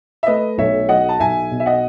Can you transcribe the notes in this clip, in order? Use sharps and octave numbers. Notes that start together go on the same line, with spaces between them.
E5
A3 B4 D#5
B1 C#5 E5
F#3 D#5 F#5
A5
B1 E5 G#5
B2
E5
D#5 F#5